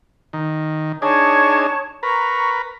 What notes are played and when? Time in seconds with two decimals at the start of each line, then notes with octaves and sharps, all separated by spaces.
0.33 D#3
1.02 D4 D#4 G#4 C#5 A5 C#6
2.03 A#4 B4 A#5 C#6